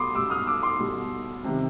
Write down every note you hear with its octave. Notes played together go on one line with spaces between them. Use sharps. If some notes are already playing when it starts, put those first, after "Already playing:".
Already playing: B2 G3 B5 C6 D6 D#6
B2 G3 D6 E6
D#6 F6
D6 E6
C6 D6
B2 G3
C3 D#3 G3